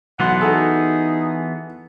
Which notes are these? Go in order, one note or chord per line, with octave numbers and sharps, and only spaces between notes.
B1 E3 B3 F#5 C6
D#4 F#4 G#4 A4